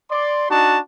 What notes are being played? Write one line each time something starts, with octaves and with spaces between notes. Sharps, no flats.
D5 C6
D4 D#4 F#4 A5